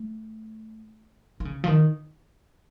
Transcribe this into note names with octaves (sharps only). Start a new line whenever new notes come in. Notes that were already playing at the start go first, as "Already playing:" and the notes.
Already playing: A3
D#3
C#3
F3
D#3